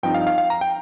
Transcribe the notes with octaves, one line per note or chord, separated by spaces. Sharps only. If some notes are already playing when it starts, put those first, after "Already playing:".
G2 F3 C4 D#4 G5
F5
F5
F5
A#5
G5